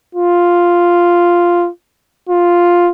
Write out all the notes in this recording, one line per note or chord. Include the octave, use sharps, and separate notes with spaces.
F4
F4